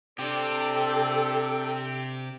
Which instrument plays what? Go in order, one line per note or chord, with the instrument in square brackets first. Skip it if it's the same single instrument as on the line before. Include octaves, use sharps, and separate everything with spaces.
[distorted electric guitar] C3 [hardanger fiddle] D4 [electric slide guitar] G4 [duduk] A4